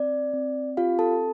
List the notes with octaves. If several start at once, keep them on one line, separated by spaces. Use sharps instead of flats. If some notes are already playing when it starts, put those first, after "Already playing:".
Already playing: C4 D5
C4
F4 G4 F5
A4 A5